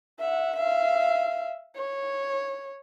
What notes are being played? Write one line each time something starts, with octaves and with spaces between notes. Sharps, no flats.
E5 F#5
E5 F5
C#5